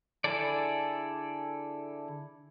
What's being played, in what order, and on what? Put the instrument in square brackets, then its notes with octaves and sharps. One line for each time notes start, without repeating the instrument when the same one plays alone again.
[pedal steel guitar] D3 E4 G#4 A4 D5